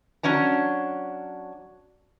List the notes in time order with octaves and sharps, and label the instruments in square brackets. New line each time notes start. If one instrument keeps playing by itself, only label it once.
[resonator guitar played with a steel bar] F#3 C#4 D4 A#5